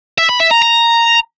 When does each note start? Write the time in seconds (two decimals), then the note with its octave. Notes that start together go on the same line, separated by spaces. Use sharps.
0.18 E5
0.29 B5
0.40 E5
0.51 A#5
0.62 A#5